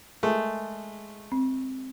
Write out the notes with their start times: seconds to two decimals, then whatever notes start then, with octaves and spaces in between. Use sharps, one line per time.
0.23 G#3 A3 A#4
1.32 C4